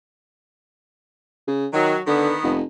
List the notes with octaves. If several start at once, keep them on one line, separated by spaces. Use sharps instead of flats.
C#3
D#3 F#3
D3 D#3 B3
F1